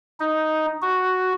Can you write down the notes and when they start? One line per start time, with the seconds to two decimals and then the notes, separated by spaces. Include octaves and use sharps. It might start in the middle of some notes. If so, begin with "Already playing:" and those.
0.20 D#4
0.82 F#4